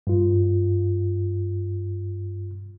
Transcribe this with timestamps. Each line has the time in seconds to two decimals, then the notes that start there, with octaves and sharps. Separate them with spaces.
0.07 G2 F4